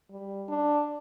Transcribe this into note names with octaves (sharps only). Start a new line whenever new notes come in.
G3
D4